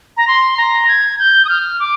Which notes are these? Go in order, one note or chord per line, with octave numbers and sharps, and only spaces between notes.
A#5
C6
A#5
G#6
G#6
G6
D#6
F6
D6